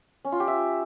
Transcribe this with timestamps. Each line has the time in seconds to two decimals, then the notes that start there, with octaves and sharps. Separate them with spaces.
0.25 C#4
0.32 F4
0.40 G4
0.48 E5